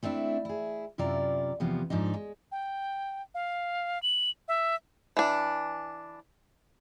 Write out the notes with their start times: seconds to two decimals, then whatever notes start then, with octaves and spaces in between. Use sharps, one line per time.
0.03 A3 C4 D4 E4
0.45 E4 G#4
0.98 F#2 C3 E4 F4 D5 A#5
1.60 E2 C3 F3 G3 B3
1.90 G#2 F3 D4 D#4
2.14 G#3
2.52 G5
3.35 F5
4.03 F#7
4.48 E5
5.17 E3 D4